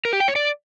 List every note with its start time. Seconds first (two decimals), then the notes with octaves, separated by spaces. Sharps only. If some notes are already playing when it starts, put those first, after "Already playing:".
0.05 A#4
0.13 G4
0.20 G5
0.28 C#5
0.36 D5